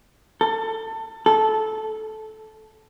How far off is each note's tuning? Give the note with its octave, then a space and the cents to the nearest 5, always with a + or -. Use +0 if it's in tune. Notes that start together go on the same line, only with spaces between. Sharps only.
A4 +25
A4 -15